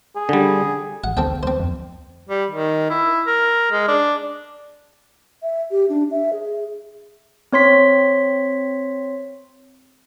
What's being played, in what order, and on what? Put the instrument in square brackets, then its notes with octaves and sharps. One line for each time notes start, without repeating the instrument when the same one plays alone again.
[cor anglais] G#4
[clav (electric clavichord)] D3 G3
[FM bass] G#1 [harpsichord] F#5
[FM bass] D2 [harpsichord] C4 A4 G5
[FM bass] D2 [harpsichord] C4 C5
[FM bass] F2
[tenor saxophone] G3
D#3
E4
A#4
G#3
D4
[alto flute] E5
G4
D4
E5
G#4
[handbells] C4 C#5 C6 B6